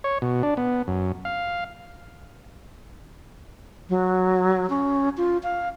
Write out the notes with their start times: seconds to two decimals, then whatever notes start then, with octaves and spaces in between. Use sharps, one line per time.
0.04 C#5
0.22 B2
0.43 D4
0.57 B3
0.88 F#2
1.25 F5
3.90 F#3
4.70 C#4
5.17 F4
5.43 F5